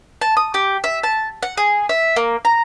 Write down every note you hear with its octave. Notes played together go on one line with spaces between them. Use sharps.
A5
D#6
G4
E5
A5
F#5
G#4
E5
A#3
A#5